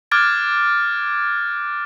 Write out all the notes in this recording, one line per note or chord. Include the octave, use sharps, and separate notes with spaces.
D6 F6 F#6 G#6 A6 D7